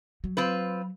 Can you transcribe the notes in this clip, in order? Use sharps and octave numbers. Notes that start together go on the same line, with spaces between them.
F#3
C4 F4 B4